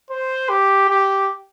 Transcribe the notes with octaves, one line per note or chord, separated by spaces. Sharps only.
C5
G4
G4